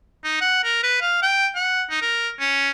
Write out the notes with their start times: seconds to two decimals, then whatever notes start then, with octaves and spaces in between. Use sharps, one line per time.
0.24 D#4
0.41 F#5
0.64 A#4
0.83 B4
1.02 F5
1.23 G5
1.56 F#5
1.90 D#4
2.02 A#4
2.40 C#4